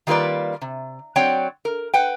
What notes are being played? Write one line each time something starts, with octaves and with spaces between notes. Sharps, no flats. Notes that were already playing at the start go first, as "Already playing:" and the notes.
D#3 G3 A#3 F4 B4 D5
C3
F#3 C4 C#5 D5 F#5 G5
A#4
B4 F#5 G5